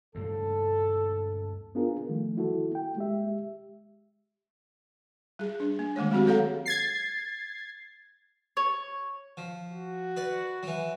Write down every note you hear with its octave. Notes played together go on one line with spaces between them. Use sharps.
D2 G2 A#3 A4
B3 D4 F4 G#4 A#4
D#3 F3 G3 A3
E4 F#4 A4
A#3 G5
G#3 G4 E5
G3 G#4
D4
A#3
D#3 G#3 A3 C#5
F#3 G#3 C4 F#4 G4
G#4 A4 C#5 F5 F#5 A#5
G#6 A6 C7
C#5
F3
F#4
B4 D5
E3 F#3